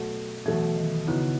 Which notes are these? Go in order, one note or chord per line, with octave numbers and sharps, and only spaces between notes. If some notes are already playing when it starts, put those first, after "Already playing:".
Already playing: B2 F#3 A3
B2 E3 F#3 A3
D#3
C#3 E3 B3 D#4 F#4